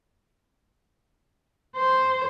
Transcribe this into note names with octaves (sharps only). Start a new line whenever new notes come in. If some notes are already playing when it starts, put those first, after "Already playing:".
C5